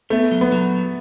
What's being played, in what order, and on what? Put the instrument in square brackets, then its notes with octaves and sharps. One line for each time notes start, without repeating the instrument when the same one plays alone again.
[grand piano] A3 [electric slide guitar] B3
[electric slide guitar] F#3
[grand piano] B3
[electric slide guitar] F#3